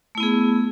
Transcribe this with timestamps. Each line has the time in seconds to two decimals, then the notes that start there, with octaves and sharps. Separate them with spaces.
0.15 A3
0.18 E4
0.20 B3
0.23 G#4